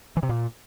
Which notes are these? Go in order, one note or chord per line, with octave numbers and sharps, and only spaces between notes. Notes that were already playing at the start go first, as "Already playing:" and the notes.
E3
C3
A#2